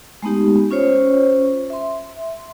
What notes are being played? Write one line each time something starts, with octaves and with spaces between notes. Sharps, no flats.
G#3 A3 B3 D#4 G4
C#4 F4 C5 C#5
E5 C6